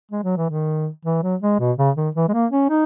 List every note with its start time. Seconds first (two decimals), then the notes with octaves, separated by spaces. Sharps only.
0.12 G#3
0.24 F#3
0.37 E3
0.49 D#3
1.05 E3
1.23 F#3
1.42 G#3
1.60 B2
1.78 C#3
1.97 D#3
2.15 E3
2.28 G#3
2.33 A#3
2.52 C#4
2.70 D#4